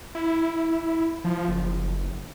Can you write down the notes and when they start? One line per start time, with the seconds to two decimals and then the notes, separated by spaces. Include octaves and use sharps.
0.15 E4
1.24 F3
1.48 F#1